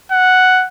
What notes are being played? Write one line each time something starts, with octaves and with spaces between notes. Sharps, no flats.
F#5